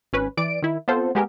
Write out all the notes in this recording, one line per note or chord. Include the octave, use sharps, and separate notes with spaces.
G#1 C#4 B4
E3 D5 D7
D#3 E4
B3 C4 F4 A4 C5
G#3 B3 G4 G#4 A#4